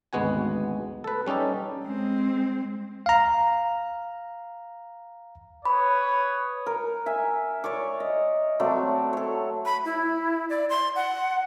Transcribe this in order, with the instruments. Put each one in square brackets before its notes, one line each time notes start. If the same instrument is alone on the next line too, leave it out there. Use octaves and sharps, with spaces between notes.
[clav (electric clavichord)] G#1 D2 G#3 B3 F#4 G#5
A4 B4
G3 C#4 D#4 G4 A4
[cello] G#3 C4
[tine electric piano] F5 A#5
[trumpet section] B4 C#5 D#6 [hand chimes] B5
[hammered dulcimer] A#4
E5 G#5
C#5 D5 C#6 D6
D#5
F#3 A3 C4 D5
A4 C#5
[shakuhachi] B5
E4
D5
C6
F#5